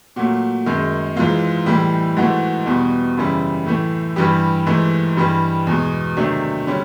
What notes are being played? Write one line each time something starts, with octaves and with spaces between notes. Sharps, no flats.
A#2 F#3 A3 F#4
F#2 D#3 G#3
G#2 E3 G#3 F4
A2 E3 G3
G#2 E3 A3 F#4
E2 B2 G3
F#2 C#3 E3 G3
A2 E3 A3
G2 E3 G3 G4
G#2 E3 A3
G2 E3 G3
E2 B2 G#3
C3 D#3 F#3 A3 D4
D3 G3 C#4